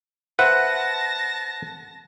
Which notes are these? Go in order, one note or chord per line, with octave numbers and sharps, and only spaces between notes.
B4 C5 E5 F#5 A5 F#6 A#6